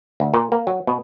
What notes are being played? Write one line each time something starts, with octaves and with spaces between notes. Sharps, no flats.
D2
A#2
A#3
F#3
B2